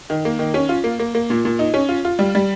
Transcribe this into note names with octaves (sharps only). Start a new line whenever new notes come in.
D#3
A#3
D#3
C#4
F4
A#3
A#3
A#3
A#2
A#2
D#4
C#4
F4
F4
G3
G3